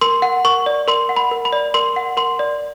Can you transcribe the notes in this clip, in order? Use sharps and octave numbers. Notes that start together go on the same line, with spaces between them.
A#4 C6
F#5
A#4 C#6
D5
A#4 C6
F#5
B5
A#4
B5
D5
A#4 C6
F#5
A#4 C6
D5